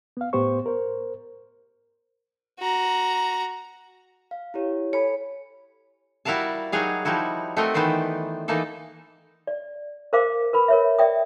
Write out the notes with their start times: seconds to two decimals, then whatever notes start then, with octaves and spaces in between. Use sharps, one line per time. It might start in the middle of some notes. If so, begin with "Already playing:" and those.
0.17 B3 F5
0.33 A2 B3 G4 C5 C#6
0.66 A#4 C5
2.59 F#4 A#5
4.31 F5
4.54 E4 G4 C#5
4.93 A4 C#5 G#5 B5
6.25 G3 E4 F#4 A#4 F5 A5
6.72 F#3 G3 D#4 F#4 G#4 F5
7.05 F3 G3 D#4 E4 F#4
7.57 A3 C4 F#4 A#4 D#5
7.74 D#3 E3 B3 C5 D5
8.48 E3 A#3 D#4 A4
9.47 D5
10.13 A#4 C5 F5 D6
10.53 A#4 B4 B5
10.68 A#4 C#5 E5
10.99 D5 E5 G5 D#6